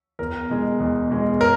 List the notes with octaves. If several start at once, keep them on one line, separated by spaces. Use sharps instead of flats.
E2 A#4
B2 G#3
E2
B2 G#3
A#4